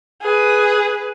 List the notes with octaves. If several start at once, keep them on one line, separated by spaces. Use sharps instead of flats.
G#4 B4